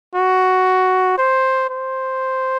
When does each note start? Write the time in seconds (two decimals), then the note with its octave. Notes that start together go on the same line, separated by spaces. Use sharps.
0.15 F#4
1.18 C5
1.70 C5